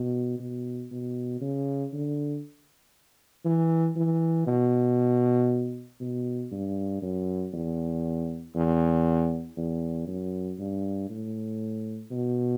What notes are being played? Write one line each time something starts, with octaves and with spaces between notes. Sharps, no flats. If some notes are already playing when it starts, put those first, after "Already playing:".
Already playing: B2
B2
B2
C#3
D3
E3
E3
B2
B2
G2
F#2
E2
E2
E2
F#2
G2
A2
B2